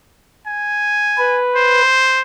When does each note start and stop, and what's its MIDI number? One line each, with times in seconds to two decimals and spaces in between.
0.47 1.39 80
1.18 1.82 71
1.55 2.22 72